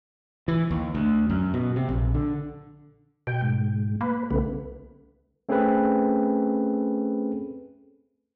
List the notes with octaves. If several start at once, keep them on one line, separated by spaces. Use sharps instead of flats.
E3
D#2
D2
F#2
B2
C3
A#1
D3
B2 G5
G#2
A#3 B4
C2 C#3 A3 B3
A3 C4 C#4 G#4 A4 B4